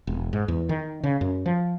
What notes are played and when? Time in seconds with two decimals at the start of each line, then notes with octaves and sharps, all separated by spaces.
0.07 E1
0.33 G#2
0.48 E2
0.69 D#3
1.04 C#3
1.21 F#2
1.46 F3